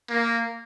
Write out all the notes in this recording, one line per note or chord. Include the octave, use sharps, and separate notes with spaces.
A#3